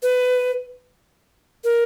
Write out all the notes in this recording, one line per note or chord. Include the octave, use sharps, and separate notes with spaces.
B4
A#4